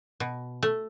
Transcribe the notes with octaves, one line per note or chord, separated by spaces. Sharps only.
B2
A3